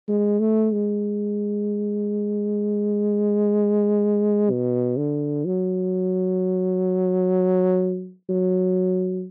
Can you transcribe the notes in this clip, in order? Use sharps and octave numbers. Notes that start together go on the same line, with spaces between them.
G#3
A3
G#3
B2
D3
F#3
F#3